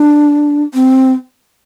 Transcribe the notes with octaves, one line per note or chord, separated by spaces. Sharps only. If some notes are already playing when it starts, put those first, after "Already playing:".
Already playing: D4
C4